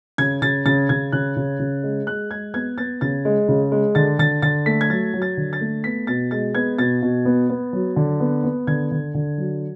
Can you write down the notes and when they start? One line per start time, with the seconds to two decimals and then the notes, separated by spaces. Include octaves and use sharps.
0.18 C#3 G#6
0.42 C#3 A6
0.66 C#3 A6
0.89 C#3 G#6
1.12 C#3 F#6
1.36 C#3
1.60 C#3
1.83 G#3
2.07 G#3 F#6
2.31 G#3 G#6
2.54 B3 G#6
2.78 B3 A6
3.01 C#3 A6
3.25 G#3
3.48 C#3
3.72 G#3
3.95 D3 A6
4.19 D3 A6
4.42 D3 A6
4.66 A3 B6
4.81 G#6
4.90 F#3 A6
5.14 F#3
5.22 A6
5.37 D3
5.53 A6
5.61 A3
5.84 B3 B6
6.07 B2 A6
6.31 G#3 A6
6.55 B3 G#6
6.78 B2 A6
7.02 B2
7.25 B3
7.49 B3
7.73 F#3
7.96 D3
8.20 B3
8.44 B3
8.67 D3 G#6
8.91 D3
9.14 D3
9.38 F#3